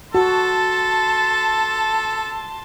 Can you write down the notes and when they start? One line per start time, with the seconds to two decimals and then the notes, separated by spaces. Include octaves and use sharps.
0.15 F#4 A4 A5 C6